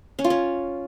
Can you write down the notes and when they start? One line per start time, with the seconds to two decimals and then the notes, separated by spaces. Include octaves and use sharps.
0.19 C#4
0.24 F4
0.30 C#4